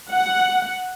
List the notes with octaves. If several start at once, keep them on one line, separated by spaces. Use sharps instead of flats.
F#5